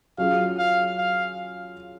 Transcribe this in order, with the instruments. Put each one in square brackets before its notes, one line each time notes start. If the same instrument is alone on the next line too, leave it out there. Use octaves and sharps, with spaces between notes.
[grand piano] F#3 C#4 F4 G#4 [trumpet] F5
[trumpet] F5
F5